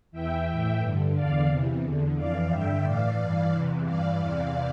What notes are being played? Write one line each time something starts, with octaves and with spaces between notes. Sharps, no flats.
E2 E3 E5 G5
A2 E3
G2 D3
E2 D3 D5 F5
E2 C3 E3
E2 D3
F2 E3 D5 F5
G2 D3 E5 G5
A2 E3 D5 F5
G2 E3
E2 C3 E3
G2 E3 D5 F5
E2 C3 E3